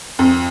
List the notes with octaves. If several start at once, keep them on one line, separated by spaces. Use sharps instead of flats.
F2